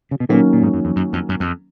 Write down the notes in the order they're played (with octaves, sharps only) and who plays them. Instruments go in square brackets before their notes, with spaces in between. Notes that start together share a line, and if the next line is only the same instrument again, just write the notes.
[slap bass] C#3
B2
[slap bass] A#2 [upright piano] D#3 F#3 A#3 C#4
[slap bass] A#2
G#2
F#2
F2
F#2
F2
F#2
F2